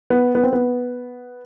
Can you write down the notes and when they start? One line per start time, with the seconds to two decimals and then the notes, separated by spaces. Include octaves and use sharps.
0.10 B3
0.35 B3
0.43 C4
0.53 B3